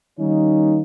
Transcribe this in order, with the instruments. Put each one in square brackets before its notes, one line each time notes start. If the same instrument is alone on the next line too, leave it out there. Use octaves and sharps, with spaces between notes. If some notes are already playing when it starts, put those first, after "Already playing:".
[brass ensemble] D#3 G3 A#3 C#4 D#4